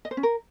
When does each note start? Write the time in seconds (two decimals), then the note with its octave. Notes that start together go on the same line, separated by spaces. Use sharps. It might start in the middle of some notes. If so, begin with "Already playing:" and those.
0.05 D#5
0.11 C5
0.17 C#4
0.23 A#4